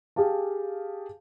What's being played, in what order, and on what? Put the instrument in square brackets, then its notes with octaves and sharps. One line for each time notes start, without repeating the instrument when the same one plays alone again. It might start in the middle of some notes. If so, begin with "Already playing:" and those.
[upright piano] G4 G#4 F5 A5